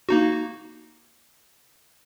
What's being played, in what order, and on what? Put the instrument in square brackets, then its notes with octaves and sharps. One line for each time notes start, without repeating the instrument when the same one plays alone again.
[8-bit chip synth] A#3 D#4 F#4